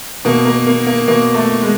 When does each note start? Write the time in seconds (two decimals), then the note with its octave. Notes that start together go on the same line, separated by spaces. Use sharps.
0.25 B2 A#3
0.45 A#3
0.67 A#3
0.87 A#3
1.08 B2 A#3
1.34 A3
1.62 G#3